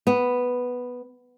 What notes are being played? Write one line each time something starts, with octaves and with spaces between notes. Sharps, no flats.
B3